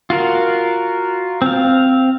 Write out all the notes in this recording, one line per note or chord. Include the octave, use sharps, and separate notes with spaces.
F4 F#4 A#4
C4 F5